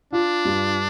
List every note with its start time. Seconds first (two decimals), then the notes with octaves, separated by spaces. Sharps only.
0.12 D4 F4
0.45 G2